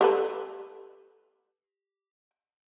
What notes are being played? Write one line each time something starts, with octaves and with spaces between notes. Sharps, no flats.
G4 A4 B4